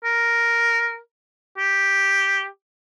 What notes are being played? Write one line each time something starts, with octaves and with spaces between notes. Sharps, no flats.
A#4
G4